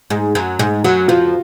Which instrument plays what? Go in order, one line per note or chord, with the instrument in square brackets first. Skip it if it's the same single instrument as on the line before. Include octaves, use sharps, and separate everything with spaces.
[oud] G#2 G#3
F#2 F#3
G#2 G#3
[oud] F#2 F#3 [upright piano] F#4
[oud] F2 F3 [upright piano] F4